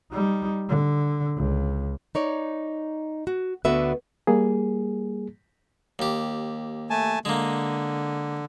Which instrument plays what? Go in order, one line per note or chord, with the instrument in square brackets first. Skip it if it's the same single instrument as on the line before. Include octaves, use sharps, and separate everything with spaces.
[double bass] G3 D#4
D3
C#2
[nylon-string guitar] D#4 C#5 D5
F#4
D2 D3 B3 F#4 B4 E5
[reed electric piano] G3 A#3 G#4
[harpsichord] D#2 G4
[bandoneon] A3 G#5 A5
[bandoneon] D3 [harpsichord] G#3 A#3